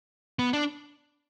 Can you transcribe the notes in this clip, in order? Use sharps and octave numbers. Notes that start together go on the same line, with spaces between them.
B3
D4